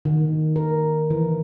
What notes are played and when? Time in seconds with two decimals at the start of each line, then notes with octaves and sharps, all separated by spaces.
0.05 D#3
0.56 A#4
1.10 E3